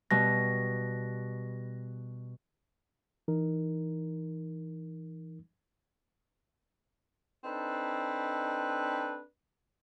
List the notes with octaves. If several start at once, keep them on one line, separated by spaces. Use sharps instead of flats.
B2 G3 A#6
E3 D#4 A#4
C4 D4 D#4 A4 B4